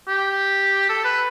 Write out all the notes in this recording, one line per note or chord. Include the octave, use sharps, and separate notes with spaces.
G4
A4
B4